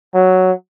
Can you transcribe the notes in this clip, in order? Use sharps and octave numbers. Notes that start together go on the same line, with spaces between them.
F#3